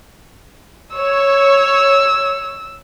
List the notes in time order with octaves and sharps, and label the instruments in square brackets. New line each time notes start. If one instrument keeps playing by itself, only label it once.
[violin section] C#5 [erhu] E6